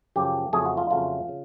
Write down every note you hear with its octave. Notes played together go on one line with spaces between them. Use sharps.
F#2 C#3 F3 G4
F2 C#3 F#3 A3 G#4
F#4
F4
F2 C#3 F#3 A3 F4
C#3